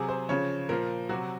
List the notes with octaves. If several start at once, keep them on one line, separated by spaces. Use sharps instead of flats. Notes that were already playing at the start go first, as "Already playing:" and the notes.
Already playing: C3 F#3 G#4
C5
C#3 F3 C#5
A#2 F3 A#4
C3 F#3 F#4